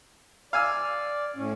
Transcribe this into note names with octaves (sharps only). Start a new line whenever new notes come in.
D5 F5 G#5 E6
A2 C#4